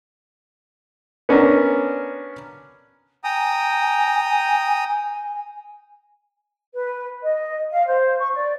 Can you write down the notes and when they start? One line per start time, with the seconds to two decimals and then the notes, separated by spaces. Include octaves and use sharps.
1.29 B3 C#4 D4 A#4
3.24 G5 G#5 A#5 D#6
6.74 B4
7.22 D#5
7.72 F5
7.87 C5
8.19 C#6
8.33 D5